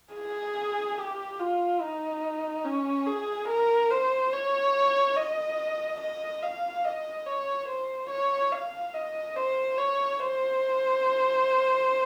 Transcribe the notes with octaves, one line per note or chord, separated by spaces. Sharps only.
G#4
G4
F4
D#4
C#4
G#4
A#4
C5
C#5
D#5
D#5
F5
D#5
C#5
C5
C#5
F5
D#5
C5
C#5
C5